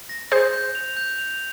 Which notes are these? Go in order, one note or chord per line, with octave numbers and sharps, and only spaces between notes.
A#6
G#4 C5 G6
G6
F7
G6
F7